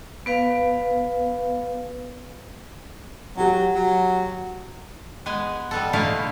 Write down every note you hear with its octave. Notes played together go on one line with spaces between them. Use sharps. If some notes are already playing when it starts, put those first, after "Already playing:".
B3 B4 F5
F#3 G4 F#5
F#3
G#3 B3 G#5
G3 B3 A4
A#2 D3 A3 D#4 E4 F5